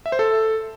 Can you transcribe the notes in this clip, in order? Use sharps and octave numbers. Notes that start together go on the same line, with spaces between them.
E5
C5
A4